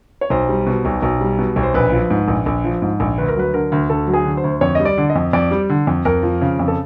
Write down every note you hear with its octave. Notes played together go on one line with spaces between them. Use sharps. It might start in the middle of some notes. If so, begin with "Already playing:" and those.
C#5
B1 C5
G3
B2
B1
B1
G3
B2
B1
C5
A#1 B4
F3
G#2
A#1
A#1
F3
G#2
A#1
D2 B4
A#4
F#3 B4
D3 A#4
D2
D2 A4
F#3
G#4
D3
C5
D2
F2 C#5
G3 D#5
D5
D3
D#5
F2
F2 D5
G3
D3
F2
F2 A#4
F3
C#3
F2
A4